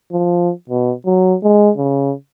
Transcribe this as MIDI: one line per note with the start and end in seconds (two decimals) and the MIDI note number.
0.12 0.51 53
0.69 0.93 47
1.06 1.36 54
1.43 1.70 56
1.77 2.13 49